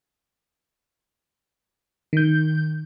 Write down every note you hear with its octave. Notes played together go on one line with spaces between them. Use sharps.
D#3 G6